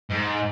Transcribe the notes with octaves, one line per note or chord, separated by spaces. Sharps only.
G#2